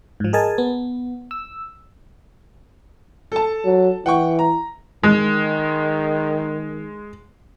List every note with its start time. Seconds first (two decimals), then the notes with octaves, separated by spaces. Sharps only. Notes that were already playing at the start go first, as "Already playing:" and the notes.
0.20 G#2 F3
0.33 G#4 A#4 D#5 G#5 A5
0.58 B3
1.31 E6
3.32 A4 A5
3.65 F#3
4.06 E3 F#5 G5 C#6
4.39 A#5
5.04 D#3 G#3